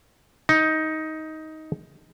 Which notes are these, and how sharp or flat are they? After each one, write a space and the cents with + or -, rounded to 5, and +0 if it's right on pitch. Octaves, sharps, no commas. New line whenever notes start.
D#4 +15